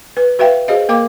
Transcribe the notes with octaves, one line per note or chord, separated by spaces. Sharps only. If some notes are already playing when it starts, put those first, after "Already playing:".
B4
F#4 B4 E5 F5 G5
F#4 G#4 C5 D#5 F5
A#3 A#4 F5 D6